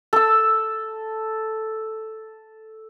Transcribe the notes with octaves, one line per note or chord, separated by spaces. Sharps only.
A4 E6